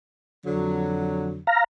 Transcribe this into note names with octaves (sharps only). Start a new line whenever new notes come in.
F2 D3 F#3
F5 A#5